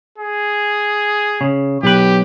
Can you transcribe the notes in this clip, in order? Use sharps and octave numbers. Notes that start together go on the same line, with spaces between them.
G#4
C#3
B1 G4 B4